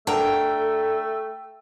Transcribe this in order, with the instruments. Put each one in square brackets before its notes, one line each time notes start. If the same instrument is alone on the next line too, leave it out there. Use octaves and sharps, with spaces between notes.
[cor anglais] A3 [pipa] D4 F#4 A#4 [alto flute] A4 [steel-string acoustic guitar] G5